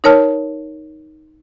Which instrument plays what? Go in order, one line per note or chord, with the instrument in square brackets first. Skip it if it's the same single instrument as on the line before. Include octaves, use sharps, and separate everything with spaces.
[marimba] D#4 A#4 C#5 A5 F6